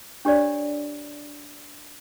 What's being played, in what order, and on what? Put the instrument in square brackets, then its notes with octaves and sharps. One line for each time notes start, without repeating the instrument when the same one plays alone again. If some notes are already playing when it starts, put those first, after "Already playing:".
[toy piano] D4 G4 C#5 D5